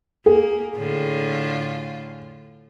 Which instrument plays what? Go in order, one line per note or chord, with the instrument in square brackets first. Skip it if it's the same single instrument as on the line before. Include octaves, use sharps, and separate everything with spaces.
[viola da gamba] A#3 [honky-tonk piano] G#4
[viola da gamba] A2 D3 F4